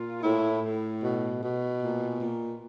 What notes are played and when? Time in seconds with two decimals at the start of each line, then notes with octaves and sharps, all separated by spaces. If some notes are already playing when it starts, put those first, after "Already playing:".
Already playing: A#2 F4
0.22 A2 E4
0.62 A2
1.02 B2
1.42 B2
1.82 A#2
2.21 A#2